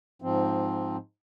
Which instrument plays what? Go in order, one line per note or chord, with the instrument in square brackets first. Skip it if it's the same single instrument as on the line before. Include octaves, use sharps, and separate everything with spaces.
[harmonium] G#2 F3 C4